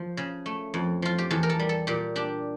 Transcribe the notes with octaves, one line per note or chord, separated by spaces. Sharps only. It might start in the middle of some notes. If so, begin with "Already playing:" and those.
Already playing: F3
C#3
A3
F2
F3 F4
G4
E2 A4
A#4
A4
G3
A4
A#2 G4
D4 G4